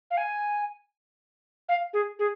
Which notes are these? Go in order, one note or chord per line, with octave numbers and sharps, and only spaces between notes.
F5
G#5
F5
G#4
G#4